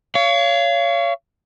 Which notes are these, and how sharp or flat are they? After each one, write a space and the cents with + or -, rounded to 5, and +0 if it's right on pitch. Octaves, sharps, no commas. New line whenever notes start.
C#5 +25 F5 -30